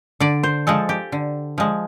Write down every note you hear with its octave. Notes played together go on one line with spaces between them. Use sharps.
D3 D5
C5
F3 G#3 A4
G4
D3
F3 G#3